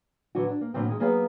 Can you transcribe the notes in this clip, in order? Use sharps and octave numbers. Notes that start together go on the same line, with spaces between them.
A2 D3 E3 F#3 F#4
D4
A#3
A2 D3 F#3 A#3 C4
D#3 G#3
F#3 A#3 B3 G#4 C#5 F5